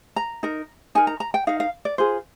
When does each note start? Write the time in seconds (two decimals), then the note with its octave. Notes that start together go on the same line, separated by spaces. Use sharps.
0.16 A#5
0.43 D#4 A#4
0.95 D#4 A#4 G#5
1.07 A#5
1.20 A#5
1.34 G5
1.47 D#4 A#4 F5
1.60 F5
1.85 D5
1.98 F4 G#4 C5